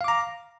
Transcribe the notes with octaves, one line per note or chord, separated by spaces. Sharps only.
F5 A#5 D6